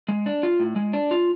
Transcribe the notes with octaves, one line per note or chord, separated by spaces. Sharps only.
G#3
D4
F4
A2
G#3
D4
F4